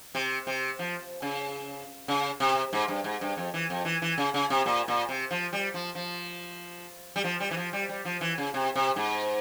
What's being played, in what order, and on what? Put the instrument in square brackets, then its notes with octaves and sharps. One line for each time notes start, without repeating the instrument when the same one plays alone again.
[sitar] C3
C3
F3
C#3
C#3
C3
G#2
G2
G#2
G2
F2
E3
F2
E3
E3
C#3
C#3
C3
A#2
A#2
C3
F3
G3
F3
F3
G3
F3
G3
E3
F3
G3
G3
F3
E3
C#3
C3
C3
G#2